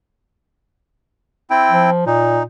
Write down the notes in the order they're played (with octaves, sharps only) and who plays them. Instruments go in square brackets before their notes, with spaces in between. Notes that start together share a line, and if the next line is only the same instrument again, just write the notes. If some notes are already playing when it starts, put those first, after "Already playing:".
[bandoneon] C4 E4 G5
[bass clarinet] F3
[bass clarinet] A#2 [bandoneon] D#4